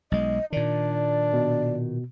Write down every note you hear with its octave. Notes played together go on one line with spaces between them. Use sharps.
B1 G#3 D#5
A#2 D#3 D4 D5
B2